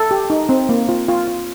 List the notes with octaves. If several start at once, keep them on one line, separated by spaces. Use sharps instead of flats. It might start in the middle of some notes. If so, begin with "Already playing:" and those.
Already playing: A4
G4
D#4
C4
A#3
F4
F4
F4